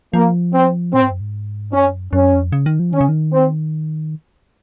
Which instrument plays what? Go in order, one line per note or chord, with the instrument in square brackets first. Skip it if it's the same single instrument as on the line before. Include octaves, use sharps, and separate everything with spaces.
[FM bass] F3 [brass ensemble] A#3
[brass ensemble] C4
[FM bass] A#2 [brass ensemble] C4
[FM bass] G#2
F#2
G#2
[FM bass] F#2 [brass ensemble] C#4
[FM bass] F#2 [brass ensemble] C#4
[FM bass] F2
C#3
D#3
F3
[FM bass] D#3 [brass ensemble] C#4
[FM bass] C#3
D#3
[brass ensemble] C4